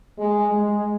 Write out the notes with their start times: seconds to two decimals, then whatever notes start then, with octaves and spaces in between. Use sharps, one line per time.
0.18 G#3
0.53 G#3